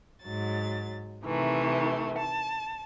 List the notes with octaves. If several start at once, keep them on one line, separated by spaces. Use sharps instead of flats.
G#2 F#3 A6
C3 D#3 E3 A3
A5